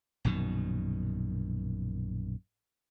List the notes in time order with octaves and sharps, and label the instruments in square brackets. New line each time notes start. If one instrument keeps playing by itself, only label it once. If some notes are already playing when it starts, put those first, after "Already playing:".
[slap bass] A#1 F#2 B2 D#3